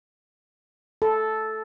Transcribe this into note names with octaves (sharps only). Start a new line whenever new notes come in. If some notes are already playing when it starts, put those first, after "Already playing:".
A4